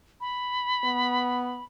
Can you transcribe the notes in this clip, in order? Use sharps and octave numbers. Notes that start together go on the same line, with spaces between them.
B5
B3